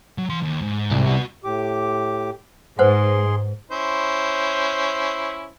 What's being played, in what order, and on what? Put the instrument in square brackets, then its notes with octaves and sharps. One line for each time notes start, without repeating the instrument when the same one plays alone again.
[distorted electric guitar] F#3
E3 C6
D#2
G#2
[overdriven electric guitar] C2
[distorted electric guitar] B3 F#4
[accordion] A2 G4 D6
[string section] G#2 [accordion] G#4 C6 [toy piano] B4 C5 F#5
[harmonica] C#4 E4 C5